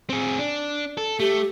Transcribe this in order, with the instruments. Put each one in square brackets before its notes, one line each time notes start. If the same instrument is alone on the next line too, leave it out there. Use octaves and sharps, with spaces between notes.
[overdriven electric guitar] C4 G#4
D4
A4
[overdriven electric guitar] A3 [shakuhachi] G4